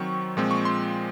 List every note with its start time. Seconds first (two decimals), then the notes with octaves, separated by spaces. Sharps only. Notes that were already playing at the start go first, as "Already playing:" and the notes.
Already playing: D#3 F#3 C4 C#6
0.37 A#2 F3 G#3 C4
0.51 C#6
0.65 C6